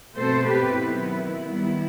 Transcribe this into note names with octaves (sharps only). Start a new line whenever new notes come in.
B2 A3 C4 A4 C5
G4 B4
D#3 F#3 B3 E4
D#3 G3 B3